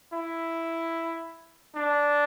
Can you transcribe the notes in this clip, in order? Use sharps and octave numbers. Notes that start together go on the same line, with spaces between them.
E4
D4